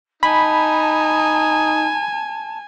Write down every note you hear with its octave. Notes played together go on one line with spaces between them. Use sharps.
D#4 G#5 A5 B5